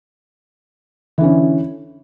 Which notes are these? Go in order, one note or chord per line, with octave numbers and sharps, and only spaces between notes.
D3 E3 C#4